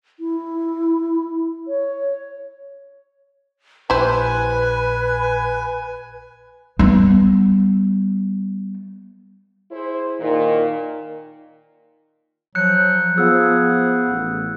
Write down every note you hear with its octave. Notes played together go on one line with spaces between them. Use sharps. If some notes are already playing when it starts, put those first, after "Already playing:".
E4
C#5
A#1 A#2 E4 G4 B4 C5 G#5
G3 B3
E4 G#4 C5
A#2 D#3
F3 F#3 F#6 G6 C#7
F3 B3 G#4 E6
A1